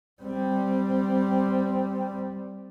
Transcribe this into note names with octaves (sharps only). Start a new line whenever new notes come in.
G3 C4